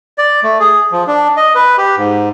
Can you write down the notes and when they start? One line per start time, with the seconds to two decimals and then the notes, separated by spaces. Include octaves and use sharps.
0.18 D5
0.43 A3
0.60 G#4
0.92 F3
1.07 D4
1.37 D#5
1.55 B4
1.78 G4
1.97 G#2